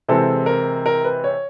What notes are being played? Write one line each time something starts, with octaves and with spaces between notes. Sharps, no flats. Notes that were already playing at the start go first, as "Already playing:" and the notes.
C3 E3 G#3 C4 A4
A#4
A#4
B4
C#5